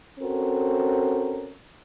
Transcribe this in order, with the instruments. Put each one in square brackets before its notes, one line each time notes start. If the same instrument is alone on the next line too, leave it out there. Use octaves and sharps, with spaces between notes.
[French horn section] C4 C#4 F#4 A4 A#4